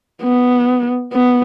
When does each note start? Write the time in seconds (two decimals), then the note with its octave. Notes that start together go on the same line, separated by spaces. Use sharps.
0.23 B3
1.13 B3